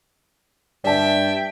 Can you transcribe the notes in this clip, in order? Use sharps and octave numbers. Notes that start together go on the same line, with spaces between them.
G2 D5 E5 G5 A5